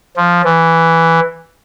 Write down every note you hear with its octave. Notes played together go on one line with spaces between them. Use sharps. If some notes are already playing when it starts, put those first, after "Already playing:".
F3
E3